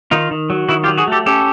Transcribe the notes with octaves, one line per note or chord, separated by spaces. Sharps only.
D#3 D#4 F4
D#3
F#3
D#3 E4 F#4
F4 G4
F#3
F#4 G#4
A3 G4 A4
C#4 G4 A4